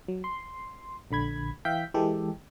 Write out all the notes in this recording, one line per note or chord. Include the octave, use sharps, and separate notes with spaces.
F#3
C6
A#1 D3 B5 G#6
E3 E5 F5 G5 G6 B6
E3 G#3 G4 A4